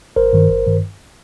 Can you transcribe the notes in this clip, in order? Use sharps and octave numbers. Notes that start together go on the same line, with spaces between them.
G#1 A#4 C5
G2 D#3
G#1
G2 D#3